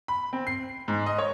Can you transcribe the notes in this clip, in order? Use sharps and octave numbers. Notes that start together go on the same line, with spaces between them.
B5
C4
C7
G#2
D#5
C#5